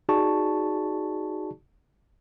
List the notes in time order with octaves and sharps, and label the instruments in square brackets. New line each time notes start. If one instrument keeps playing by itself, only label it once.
[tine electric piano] D#4 F#4 G#4 D5 A5 C#6